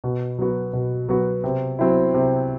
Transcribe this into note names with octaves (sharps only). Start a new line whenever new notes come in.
B2
F#3 B3 F#4
B2
F#3 B3 F#4
C3
F#3 C4 E4
C3